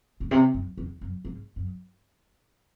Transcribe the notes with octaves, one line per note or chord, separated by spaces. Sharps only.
A2
C3
F#2
E2
F#2
G#2
F#2